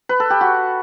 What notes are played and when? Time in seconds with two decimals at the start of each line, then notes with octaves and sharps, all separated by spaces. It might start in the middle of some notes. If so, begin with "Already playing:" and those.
0.09 B4
0.20 A4
0.30 G4
0.41 F#4